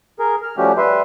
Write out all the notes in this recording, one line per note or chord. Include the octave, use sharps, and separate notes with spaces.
G#4 A#4
F6
F3 G3 A3 C#4 F#4 G4
G3 B4 E5 C6